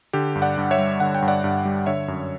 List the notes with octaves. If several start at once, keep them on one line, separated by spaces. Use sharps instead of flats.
D3 G4
G2
D5 F#5
G2
C#5 E5
G3
D3 F#5
G5
G2
D5 F#5
G2
G3
D3 C#5 E5
F#2